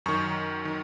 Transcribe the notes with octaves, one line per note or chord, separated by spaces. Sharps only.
F#2 D#3 C#6
D#3